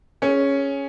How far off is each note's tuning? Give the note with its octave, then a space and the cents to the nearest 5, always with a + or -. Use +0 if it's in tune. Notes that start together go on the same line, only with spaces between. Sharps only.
C#4 +0 G#4 +5